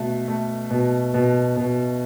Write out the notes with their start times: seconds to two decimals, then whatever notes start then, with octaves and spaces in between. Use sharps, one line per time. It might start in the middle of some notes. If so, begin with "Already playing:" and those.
Already playing: B2 A3 F#4
0.28 A3
0.71 B2
1.14 B2
1.57 B2